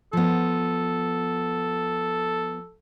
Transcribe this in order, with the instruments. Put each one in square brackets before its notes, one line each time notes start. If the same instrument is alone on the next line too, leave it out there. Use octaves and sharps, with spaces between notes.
[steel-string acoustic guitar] F3 B3 [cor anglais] A4